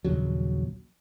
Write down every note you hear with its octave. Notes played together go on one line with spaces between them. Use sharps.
A#1 D#2 C#3 F#3